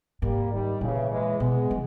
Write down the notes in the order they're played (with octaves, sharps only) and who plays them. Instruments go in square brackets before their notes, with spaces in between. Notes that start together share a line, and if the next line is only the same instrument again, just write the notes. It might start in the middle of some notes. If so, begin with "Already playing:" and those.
[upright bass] G#2 [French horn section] G3 A#3
[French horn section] D#3 G3
[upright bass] A#2 [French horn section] C#3 E3
[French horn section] E3 G#3
[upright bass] B2 [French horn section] G#3 B3
[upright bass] E3